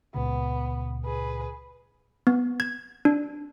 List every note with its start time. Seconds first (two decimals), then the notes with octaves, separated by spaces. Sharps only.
0.14 C#2 A#2 C#3 B3
1.04 G#4 B4
2.27 B3
2.60 G#6
3.05 D4